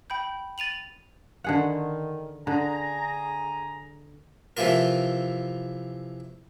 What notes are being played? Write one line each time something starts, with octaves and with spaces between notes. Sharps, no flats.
G5 B5 G6
A6 D#7 F7 F#7
D3 D#3 G#4 F#5
D3 G#4 G#5 A#5
C3 E3 F3 E4 F4 A#4